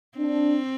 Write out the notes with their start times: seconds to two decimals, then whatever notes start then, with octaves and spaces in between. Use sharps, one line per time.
0.18 C4 D4